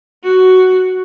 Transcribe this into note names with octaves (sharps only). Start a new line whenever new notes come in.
F#4